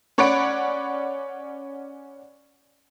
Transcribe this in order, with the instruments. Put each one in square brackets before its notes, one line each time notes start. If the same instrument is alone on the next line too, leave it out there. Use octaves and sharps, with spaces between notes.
[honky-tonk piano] C#4 C#5 D5 F#5 B5 D7